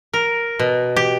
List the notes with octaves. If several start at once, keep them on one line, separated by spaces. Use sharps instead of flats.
A#4
B2
G4